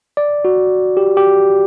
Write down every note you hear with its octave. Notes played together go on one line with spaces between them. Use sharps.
D5
F#4
G4
G4